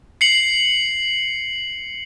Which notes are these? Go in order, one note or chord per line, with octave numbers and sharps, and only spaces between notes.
C7 C#7 F#7